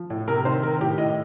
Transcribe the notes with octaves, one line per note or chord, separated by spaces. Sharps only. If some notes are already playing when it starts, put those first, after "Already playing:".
Already playing: F3
A2
C3 A#4
D#3 C5
D#3 A#4
A2 G4
A2 D#5